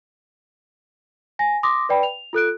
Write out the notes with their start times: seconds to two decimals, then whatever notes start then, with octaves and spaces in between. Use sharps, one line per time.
1.39 G#5 A#6
1.63 C6 D6 D#6 A#6
1.89 B4 D5 G5 B5
2.03 F7
2.33 F4 A4 F#6 D7